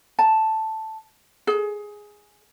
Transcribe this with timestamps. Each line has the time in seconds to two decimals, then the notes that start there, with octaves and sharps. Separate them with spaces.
0.19 A5
1.47 G#4